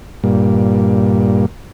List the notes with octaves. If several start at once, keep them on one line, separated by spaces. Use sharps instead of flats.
G2 A#2